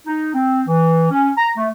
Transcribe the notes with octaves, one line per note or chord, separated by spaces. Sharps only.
D#4
C4
E3
C#4
A#5
A3